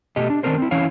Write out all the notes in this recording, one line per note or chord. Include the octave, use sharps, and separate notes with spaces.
B2 A3 G4 D#5
D4
D#3 G#3 C4 D4 A#4 C5
C4 E4
E3 C#4 E4 C#5 F5